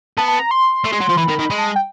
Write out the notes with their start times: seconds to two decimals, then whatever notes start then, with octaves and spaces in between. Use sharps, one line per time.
0.18 B3 A5
0.28 A5
0.39 A#5
0.51 C6
0.84 A3
0.92 G#3
1.00 F#3
1.09 F3
1.17 E3 B5
1.28 D#3
1.39 D#3
1.50 G#3
1.58 A5
1.76 G5